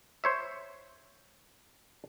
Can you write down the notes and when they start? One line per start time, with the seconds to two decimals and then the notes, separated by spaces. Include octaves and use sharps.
0.24 C5 C#5 E5